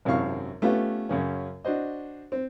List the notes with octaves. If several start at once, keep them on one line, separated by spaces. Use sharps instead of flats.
G#1 F#2 C3 E4 F5 C#6
A3 B3 C#4 F4 G4 B4
F#2 C#3 C#4
D4 F#4 C5 D#5
C4